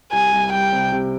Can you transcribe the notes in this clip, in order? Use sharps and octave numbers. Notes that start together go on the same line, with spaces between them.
C2 G#5
C2
G3 G5
C3
C3